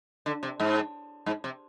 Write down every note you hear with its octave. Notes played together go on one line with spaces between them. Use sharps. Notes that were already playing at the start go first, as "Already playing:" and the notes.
D3
C3
G#2
G#2
C3